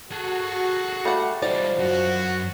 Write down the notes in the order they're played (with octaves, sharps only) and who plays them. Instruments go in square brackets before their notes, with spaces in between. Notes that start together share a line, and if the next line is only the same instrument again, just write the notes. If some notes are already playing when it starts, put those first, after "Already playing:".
[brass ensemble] F#4 [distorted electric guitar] G#4 A4
[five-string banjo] G3 F#5 [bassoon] A3
[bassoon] F3 [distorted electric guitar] G3 D#4 [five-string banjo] D5
[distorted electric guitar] F#2 [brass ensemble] F#4